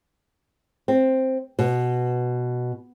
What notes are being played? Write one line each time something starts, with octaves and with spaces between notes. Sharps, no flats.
C4
B2